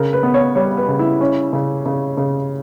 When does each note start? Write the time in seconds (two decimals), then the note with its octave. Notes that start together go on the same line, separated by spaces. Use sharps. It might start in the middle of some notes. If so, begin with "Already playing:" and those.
Already playing: C#3 A#4
0.13 B4
0.23 B3
0.34 C#5
0.55 G3 C#5
0.77 B4
0.88 C#3
0.99 E4
1.21 C#4
1.53 C#3
1.86 C#3
2.17 C#3